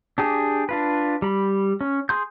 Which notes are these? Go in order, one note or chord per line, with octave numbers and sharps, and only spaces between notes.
D4 G4 G#4
D4 F4 B4
G3 B5
C#4
G#4 C6 G6